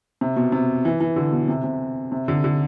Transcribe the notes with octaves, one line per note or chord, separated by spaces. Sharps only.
C3
B2
C3
E3
E3
D3
B2
C3
C3
C3
D3
D3